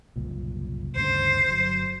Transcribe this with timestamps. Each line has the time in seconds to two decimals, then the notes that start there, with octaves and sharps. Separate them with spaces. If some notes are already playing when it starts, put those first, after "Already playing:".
0.16 F#1 C2 A#2
0.96 D2 G2 C#3 C5
1.47 G1 F#3